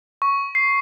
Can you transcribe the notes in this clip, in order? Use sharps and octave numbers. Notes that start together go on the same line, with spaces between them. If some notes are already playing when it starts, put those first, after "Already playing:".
C#6
C7